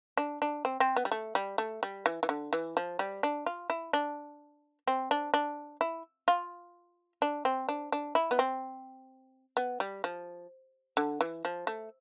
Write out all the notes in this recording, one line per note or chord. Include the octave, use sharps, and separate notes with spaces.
D4
D4
C4
C4
B3
G3
A3
G3
A3
G3
E3
E3
D3
E3
F3
G3
D4
F4
E4
D4
C4
D4
D4
E4
F4
D4
C4
D4
D4
E4
B3
C4
B3
G3
F3
D3
E3
F3
A3